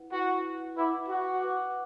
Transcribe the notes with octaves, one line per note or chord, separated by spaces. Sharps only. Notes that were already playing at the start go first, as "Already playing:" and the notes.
Already playing: E4 B4 F#5
E4 F#4 B4 F#5
E4 B4 F#5 D6
F#4
B4 F#5 D6